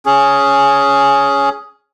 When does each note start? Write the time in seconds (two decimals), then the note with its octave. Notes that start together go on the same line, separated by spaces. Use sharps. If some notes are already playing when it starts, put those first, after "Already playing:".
0.06 C#4 G#4